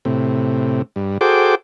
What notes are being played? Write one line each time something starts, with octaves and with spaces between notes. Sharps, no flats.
A2 C3
G2
F#4 G#4 A4 C5 G5 D6